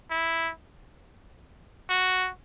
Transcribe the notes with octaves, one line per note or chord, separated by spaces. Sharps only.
E4
F#4